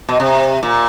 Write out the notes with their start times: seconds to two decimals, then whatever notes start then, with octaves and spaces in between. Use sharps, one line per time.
0.09 B2
0.20 C3
0.63 A#2